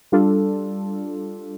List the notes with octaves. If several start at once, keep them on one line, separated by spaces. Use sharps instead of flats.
G3 D4 F4 A4